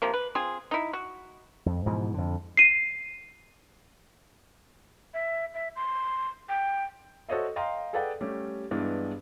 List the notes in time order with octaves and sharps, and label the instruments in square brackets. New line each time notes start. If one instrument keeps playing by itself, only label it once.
[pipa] C3 F3 A#3
B4
C4 F4 G#4
D#4 E4
F#4
[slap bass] F2
G#2 B2 E3 F3
F2 D3
[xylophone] C7 D#7
[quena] E5
E5
C6
G5
[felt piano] F#4 A4 C5 C#5 D#5 E5
D#5 F5 G5 A#5 C6
G#4 A4 B4 D5 F#5 G5
G3 A3 C#4 G4
G2 E3 G#3 B3 D4 E4